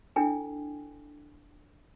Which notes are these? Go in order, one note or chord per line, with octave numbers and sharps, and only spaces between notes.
D4 E4 A4 G5 G#5